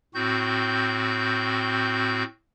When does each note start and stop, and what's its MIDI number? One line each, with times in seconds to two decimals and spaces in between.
0.15 2.23 45
0.15 2.23 60
0.15 2.23 66
0.15 2.23 91